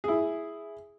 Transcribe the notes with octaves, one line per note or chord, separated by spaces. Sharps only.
E4 G#4